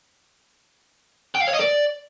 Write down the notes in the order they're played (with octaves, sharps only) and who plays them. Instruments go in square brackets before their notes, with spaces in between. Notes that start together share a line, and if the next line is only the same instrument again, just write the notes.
[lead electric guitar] G5
F5
C#5
D#5
D5